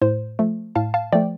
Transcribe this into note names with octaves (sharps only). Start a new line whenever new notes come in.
A2 C5
F3 A3
A2 F5 A5
F5 A5
F3 A3 D5 G5